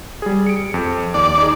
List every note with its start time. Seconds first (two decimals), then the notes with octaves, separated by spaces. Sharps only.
0.22 G3 G#4
0.47 C#7 D7
0.74 F2
1.14 D#2 D5
1.38 D#4 G#4